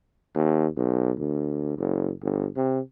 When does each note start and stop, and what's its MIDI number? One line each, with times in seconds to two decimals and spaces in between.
0.36 0.67 39
0.77 1.12 35
1.18 1.74 38
1.78 2.12 30
2.23 2.47 31
2.57 2.80 48